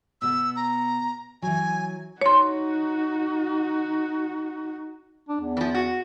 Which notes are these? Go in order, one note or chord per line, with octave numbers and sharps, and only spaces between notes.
B2 B3 E6
A#5
E3 F#3 G#5
D#4 F#4 C#5 C6
D4
E2
E3 F3
F#4